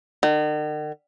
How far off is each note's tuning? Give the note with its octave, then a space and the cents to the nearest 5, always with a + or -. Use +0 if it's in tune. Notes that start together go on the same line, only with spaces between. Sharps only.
D#3 -45